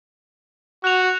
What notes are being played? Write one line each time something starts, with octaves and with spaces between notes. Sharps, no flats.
F#4 F#6 F7